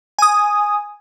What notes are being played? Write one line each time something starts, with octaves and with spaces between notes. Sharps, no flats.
G#5 D#6